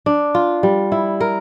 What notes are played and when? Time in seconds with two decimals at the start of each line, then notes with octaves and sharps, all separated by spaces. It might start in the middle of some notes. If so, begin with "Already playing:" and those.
0.06 D4
0.35 F4
0.63 G3
0.92 E4
1.20 A#4